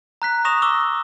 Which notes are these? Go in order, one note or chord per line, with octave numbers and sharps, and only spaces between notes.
A#5 F#6 B6
C#6 D#6 A#6 E7 F7
D6 E6 E7 G7